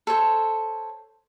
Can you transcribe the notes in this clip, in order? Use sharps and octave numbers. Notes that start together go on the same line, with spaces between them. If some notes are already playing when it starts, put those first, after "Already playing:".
A4 C5 C#5 C#6